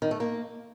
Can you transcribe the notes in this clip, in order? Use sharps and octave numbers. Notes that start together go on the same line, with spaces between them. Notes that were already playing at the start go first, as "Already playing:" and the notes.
D#3
A3
A#3